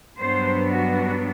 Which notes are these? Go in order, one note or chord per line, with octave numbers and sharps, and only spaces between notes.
G2 F#3 B3 D4 C5
F#4